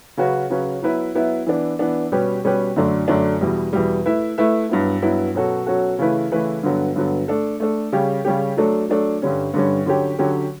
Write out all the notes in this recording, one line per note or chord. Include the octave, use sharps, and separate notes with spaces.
C#3 F#3 C#4 F#4 B4
C#3 F#3 C#4 F#4 B4
F#3 B3 E4 B4 E5
F#3 B3 E4 B4 E5
E3 B3 D4
E3 B3 D4
B2 G3 C#4 G4 B4
B2 G3 C#4 G4 B4
F#2 D3 F#3 A3 D4
F#2 D3 F#3 A3 D4
E2 B2 G3
E2 B2 G3
A3 E4 B4 E5
A3 E4 B4 E5
G2 F#3 B3 E4
G2 F#3 B3 E4
B2 F#3 C#4 F#4 A4
B2 F#3 C#4 F#4 A4
C#3 E3 A3 E4 B4
C#3 E3 A3 E4 B4
G2 D3 F#3 B3
G2 D3 F#3 B3
A3 D4 A4
A3 D4 A4
C#3 G3 C#4 G4
C#3 G3 C#4 G4
F#3 A3 D4 A4
F#3 A3 D4 A4
G2 D3 G3 C#4
G2 D3 G3 C#4
D3 F#3 C#4 G4
D3 F#3 C#4 G4